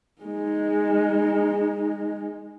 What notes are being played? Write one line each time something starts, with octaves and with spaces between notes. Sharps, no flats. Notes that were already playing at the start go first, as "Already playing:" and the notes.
G#3 D#4